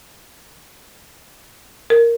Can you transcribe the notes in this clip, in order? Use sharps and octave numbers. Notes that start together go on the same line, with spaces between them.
A#4